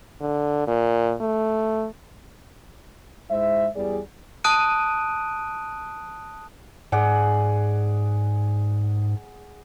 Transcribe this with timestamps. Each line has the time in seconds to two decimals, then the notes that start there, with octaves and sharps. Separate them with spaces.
0.21 D3
0.68 A#2
1.21 A3
3.31 G#2 G#3 E4 C5 E5
3.76 E2 G3 G#4 D5
4.44 A5 D#6 F#6 D7 D#7
6.92 G#2 G#4 D5 F#5